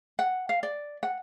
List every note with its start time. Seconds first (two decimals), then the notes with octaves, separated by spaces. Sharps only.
0.19 F#5
0.49 F5
0.63 D5
1.03 F#5